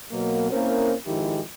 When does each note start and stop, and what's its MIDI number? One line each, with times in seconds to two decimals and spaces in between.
0.12 0.50 47
0.12 0.50 54
0.12 0.50 58
0.51 0.94 58
0.51 0.94 60
0.51 0.94 61
0.51 0.94 64
0.51 0.94 70
0.51 0.94 72
1.07 1.41 32
1.07 1.41 41
1.07 1.41 51
1.07 1.41 56
1.07 1.41 64
1.07 1.41 67